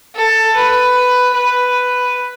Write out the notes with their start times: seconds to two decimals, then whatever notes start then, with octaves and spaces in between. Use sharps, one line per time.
0.16 A4
0.56 B4
1.34 B4